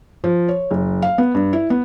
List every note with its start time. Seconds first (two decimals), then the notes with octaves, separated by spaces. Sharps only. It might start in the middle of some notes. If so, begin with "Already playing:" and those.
0.24 F3
0.48 C#5
0.71 F#1
1.02 F5
1.18 B3
1.35 G2
1.53 E4
1.70 B3